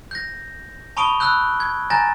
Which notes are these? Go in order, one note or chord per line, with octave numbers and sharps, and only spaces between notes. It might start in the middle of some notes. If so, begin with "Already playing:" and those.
G6 A#6
A5 B5 C#6 D#6 D7 G7
B5 E6 F#6 G6
G#6
G#5 A#5 G6 A6 A#6